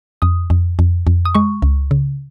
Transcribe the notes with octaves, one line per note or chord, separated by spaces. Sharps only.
F2 D#6
F2
F2
F2
D#6
G#3 C#6
C#2
C#3